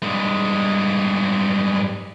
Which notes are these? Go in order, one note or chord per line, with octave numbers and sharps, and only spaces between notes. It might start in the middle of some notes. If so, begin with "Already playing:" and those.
G2 G#3